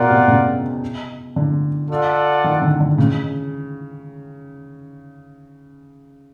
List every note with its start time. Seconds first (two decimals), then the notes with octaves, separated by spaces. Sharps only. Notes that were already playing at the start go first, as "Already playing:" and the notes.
Already playing: B2 F4 A#4 D5 F#5
0.10 C3
0.28 C#3
1.36 D3
1.90 F4 A4 D5 F#5
2.44 D#3
2.62 D3
2.80 D3
2.98 C#3